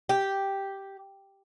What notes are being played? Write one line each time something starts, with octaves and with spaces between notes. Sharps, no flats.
G4